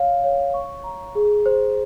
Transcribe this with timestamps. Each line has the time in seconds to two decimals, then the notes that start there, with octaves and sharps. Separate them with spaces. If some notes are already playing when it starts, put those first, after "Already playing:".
Already playing: C#5 F5
0.24 C#5
0.54 C#6
0.84 A#5
1.15 G#4
1.46 C5